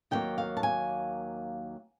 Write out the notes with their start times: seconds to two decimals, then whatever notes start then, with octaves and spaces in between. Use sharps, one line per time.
0.11 D#2 C#3 F#3 A#3 G5
0.38 F5
0.57 A5
0.63 G#5